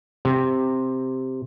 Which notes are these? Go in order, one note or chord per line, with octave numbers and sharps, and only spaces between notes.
C3